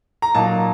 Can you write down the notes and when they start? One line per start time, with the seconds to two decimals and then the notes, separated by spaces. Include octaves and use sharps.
0.22 A#5
0.35 A#2 F#3 A#3 D#4 A5